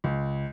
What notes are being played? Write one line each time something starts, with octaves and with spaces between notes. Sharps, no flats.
C#2